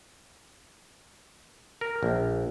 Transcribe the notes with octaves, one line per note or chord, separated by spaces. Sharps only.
A#4
A#1